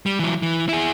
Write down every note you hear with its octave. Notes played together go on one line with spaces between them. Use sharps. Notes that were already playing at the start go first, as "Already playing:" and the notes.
G3
E3 F#3
E3
E4 G#4